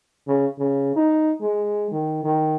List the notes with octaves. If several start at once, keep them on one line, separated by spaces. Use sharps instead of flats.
C#3
C#3
D#4
G#3
D#3
D#3